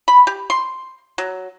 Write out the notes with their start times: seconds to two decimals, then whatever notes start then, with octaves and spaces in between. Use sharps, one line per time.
0.08 B5
0.27 G4
0.50 C6
1.18 F#3